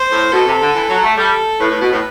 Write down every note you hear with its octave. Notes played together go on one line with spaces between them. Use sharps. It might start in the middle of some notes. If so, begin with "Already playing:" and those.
Already playing: C5
A2
B2 A4
C3
D3
E3
F#3
A3
G3 A4
A2 B4
A2
B2
A2